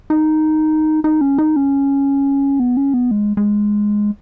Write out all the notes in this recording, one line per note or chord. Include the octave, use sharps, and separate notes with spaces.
D#4
D#4
C#4
D#4
C#4
B3
C#4
B3
G#3
G#3